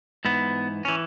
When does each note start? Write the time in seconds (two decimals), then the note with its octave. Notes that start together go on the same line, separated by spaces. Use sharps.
0.25 G#2 E3 B3
0.85 E3 C#4